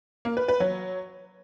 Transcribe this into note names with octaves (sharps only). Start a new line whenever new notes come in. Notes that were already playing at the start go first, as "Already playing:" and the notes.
A#3
B4
B4
F#3